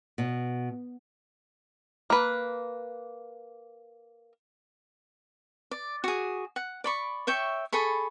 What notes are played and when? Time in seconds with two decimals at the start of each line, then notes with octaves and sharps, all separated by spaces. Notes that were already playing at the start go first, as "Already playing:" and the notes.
0.18 B2
2.10 A#3 B4
5.71 D5
6.04 F#4 G#4
6.56 F#5
6.84 D5 B5 C#6
7.27 C#5 E5 G5 C#6
7.73 G#4 A4 B5 C#6